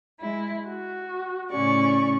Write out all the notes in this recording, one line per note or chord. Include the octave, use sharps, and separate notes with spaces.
G#3 E4
F#4
A2 C#3 C#4 D5 C#6